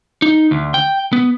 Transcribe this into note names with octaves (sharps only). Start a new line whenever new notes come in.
D#4
D2
G5
B3